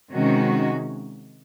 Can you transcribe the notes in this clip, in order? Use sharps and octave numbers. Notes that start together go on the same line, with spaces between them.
C3 D#3 G#3 C#4 F#4